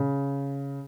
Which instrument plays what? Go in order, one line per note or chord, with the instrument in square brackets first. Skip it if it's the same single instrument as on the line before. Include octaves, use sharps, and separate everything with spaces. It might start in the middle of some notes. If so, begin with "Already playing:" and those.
Already playing: [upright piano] C#3